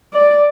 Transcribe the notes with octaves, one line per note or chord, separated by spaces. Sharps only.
D5